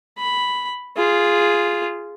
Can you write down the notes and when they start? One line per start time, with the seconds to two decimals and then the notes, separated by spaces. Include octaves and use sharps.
0.18 B5
0.97 F4 G#4